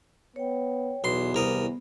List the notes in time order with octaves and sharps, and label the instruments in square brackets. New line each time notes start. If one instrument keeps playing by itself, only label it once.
[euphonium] B3 [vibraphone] C#5 G5
[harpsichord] B1 C6 [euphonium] E2 [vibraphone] B3
[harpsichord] C2 A#4 D#6